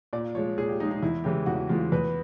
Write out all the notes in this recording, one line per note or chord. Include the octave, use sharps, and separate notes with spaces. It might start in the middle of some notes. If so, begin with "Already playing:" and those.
A#2 D5
F3 G#3 C#5
A#2 G#4
G4
F3 G#3 D#4
D#4
E2 E4
C#3 E3 G#3 G4
E2 F#4
C#3 E3 G#3 F4
E2 B4